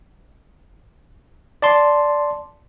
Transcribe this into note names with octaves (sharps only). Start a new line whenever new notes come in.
D5 A5 C6